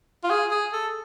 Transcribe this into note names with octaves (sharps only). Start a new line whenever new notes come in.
F4
G#4
G#4
A4